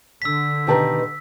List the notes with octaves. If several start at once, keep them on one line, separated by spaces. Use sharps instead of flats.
D3 E6 B6
B2 D#3 G4 B4 A5 A#5